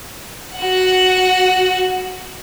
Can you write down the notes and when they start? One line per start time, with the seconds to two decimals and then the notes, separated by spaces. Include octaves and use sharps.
0.56 F#4 F#5